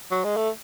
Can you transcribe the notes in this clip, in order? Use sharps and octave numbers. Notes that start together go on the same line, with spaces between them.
F#3
G#3
A3